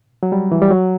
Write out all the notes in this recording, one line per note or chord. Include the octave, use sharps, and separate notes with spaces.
F#3
G3
E3
G3
F#3